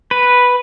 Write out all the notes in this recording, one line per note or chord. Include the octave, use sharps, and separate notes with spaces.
B4